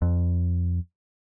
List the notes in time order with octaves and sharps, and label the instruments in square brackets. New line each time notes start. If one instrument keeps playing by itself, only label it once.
[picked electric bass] F2